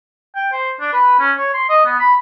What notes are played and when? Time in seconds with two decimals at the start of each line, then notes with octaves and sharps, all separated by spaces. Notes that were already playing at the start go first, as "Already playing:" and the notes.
0.36 G5
0.52 C5
0.80 D4
0.93 B4
1.20 C#4
1.37 C#5
1.54 C6
1.69 D#5
1.85 B3
1.99 B5